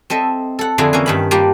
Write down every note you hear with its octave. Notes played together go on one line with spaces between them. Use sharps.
C4 A4 D#5 E5
A4 F#5
F2 D3 E4 F4 G#4 A#5
E3 A#3 C#4
G2 D#3 B5
G3 A#3 D4 F4 G4